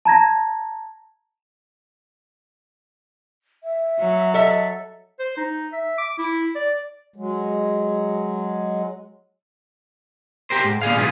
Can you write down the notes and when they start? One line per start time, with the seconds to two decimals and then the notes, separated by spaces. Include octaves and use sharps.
0.05 A5 A#5 G#6 A#6
3.64 E5
4.00 F#3
4.34 A4 D#5 E5
5.19 C5
5.37 D#4
5.73 E5
5.98 D6
6.18 E4
6.55 D5
7.16 F#3 G#3
10.50 G4 A#4 C5
10.64 G#2
10.82 A#2 D3 G#4 F5
10.97 B1 G#2 F4 F#4 G#4 B4